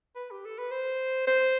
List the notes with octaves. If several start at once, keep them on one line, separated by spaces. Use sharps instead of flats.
B4
G4
A4
B4
C5
C5